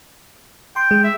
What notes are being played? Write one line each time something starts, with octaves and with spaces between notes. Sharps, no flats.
G5 C6
G#3
E5